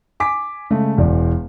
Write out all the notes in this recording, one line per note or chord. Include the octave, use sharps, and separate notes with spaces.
G#5 D6 B6
C#3 G#3 A3
E1 E2 D5